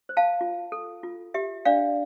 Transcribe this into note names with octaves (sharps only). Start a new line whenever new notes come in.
C5
F5 A5
F4
A4
F4
G4 E5
D4 D5 F5